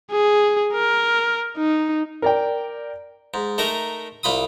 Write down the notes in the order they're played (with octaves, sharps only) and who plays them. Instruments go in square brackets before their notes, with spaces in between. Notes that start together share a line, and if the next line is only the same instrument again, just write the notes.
[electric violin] G#4
A#4
D#4
[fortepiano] A#4 D5 G5
[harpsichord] G#2
A3 D#4 A#4
C2 F4 B5 D#6